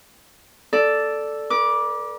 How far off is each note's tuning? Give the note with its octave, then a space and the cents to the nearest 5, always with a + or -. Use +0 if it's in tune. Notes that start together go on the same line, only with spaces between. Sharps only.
A4 +0 D5 +0
B4 -45 D6 +0